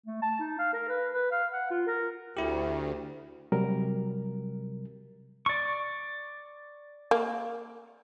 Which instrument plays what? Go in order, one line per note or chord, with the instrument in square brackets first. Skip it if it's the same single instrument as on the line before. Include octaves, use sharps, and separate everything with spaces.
[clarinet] A3
A5
D#4
F5
A#4
B4
B4
F5
F#5
F4
A#4
[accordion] D2 [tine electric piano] E4 G4
[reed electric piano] C3 F#3 G3 A#4
[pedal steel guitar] D5 C#6
[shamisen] A#3